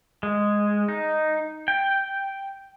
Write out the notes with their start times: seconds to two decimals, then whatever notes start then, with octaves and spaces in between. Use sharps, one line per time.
0.23 G#3
0.88 D#4
1.68 G5